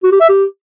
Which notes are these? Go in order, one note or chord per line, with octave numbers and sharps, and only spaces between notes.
F#4
G4
E5
G4